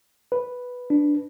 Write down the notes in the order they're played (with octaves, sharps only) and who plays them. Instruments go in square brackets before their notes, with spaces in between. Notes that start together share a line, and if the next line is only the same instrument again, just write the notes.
[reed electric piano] B4
[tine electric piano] D4